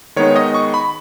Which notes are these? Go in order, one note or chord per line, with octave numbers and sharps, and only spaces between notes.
D#3 G#3 B3 D#4 C#5
D#5
C#6
B5